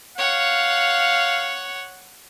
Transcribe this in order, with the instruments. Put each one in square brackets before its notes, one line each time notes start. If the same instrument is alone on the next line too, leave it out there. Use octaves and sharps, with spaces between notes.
[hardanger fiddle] C#5 F#5 [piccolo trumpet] F5